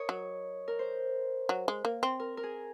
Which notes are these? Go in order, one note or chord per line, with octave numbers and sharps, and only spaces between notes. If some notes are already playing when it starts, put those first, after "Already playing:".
Already playing: A#4 C#5 D#5
F#3
A#4
C5
F#3
G#3
A#3
C4
A#4
A#4
G#4